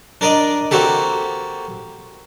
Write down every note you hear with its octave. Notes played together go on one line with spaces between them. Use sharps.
D4 A#4 D5 D#5
A#3 C4 F#4 G4 A4